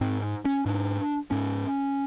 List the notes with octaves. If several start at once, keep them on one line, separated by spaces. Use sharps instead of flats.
G#2 C4
C#4
G#2 D4
G#2 C#4